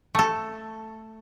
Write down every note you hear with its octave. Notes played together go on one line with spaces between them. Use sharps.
A3 A4